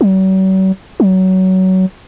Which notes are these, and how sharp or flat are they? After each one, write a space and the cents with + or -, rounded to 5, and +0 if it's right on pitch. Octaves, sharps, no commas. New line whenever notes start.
F#3 +45
F#3 +20